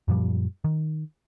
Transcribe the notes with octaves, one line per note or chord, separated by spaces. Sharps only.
F#2 A#2 F3 G3
D#3